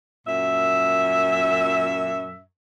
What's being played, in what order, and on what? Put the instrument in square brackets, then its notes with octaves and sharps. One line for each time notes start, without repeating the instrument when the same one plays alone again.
[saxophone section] F#2 A#2 E5